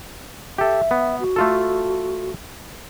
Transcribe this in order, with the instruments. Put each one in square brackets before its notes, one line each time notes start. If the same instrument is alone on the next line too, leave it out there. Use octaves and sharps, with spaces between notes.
[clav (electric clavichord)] G4 A4 [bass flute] E5
[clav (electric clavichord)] B3
[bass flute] F#4
[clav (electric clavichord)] A3 F4 A4